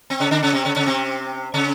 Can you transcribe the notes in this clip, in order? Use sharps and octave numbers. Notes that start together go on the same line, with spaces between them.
C4
C#3 C#4
D3 D4
C#3 C#4
C3 C4
C#3 C#4
C#3 C#4
C3 C4
C#3 C#4